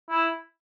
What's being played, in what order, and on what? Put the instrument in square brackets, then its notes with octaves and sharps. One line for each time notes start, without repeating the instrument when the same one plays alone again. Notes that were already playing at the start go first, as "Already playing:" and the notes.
[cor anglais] E4